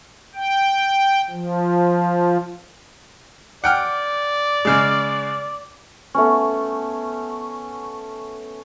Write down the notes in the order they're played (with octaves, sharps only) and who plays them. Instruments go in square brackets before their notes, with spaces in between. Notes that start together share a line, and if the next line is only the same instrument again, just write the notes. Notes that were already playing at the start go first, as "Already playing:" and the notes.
[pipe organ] G5
F3
[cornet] D5 [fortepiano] F#5 G5 F6
[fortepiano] C#3 G#3
[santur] A3 B3 C#4